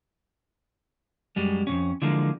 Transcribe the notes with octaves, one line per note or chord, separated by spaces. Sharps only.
F#2 G3 G#3
F2 G#2 C#4
D3 E3 F3 G#3 A#3